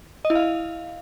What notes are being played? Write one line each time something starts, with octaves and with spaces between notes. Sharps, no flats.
D#5
E4
F5